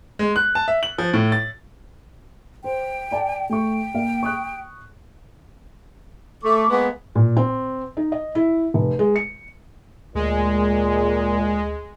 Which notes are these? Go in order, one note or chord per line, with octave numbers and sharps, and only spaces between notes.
G#3
F#6
A5
E5
F#7
F3
A2
A6
C5 G5
D5 G#5 A5
A3 G5 C#6
A#3 F5
C#6 D#6 F#6
A3 C#6 D6
G#3 A#3 B3
A#2
C4
D#4
D#5
E4
F1
G#3
C#7
D2 A#2 G#3